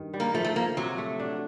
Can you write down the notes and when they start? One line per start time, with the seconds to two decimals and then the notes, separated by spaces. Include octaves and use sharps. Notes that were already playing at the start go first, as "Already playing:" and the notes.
Already playing: G2 D#3
0.14 G3
0.20 A#3
0.34 F3 A3
0.45 A3
0.56 F3 A#3
0.77 C3 F#3
0.98 A3
1.20 D4